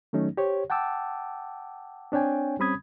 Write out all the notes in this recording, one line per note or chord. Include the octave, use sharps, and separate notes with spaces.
D#3 F#3 A3 C#4 D#4
G4 C5 C#5
F#5 G5 A5 D6 E6
C4 D4 C#5 G5 G#5
G3 C4 C#4 B5 D#6 G#6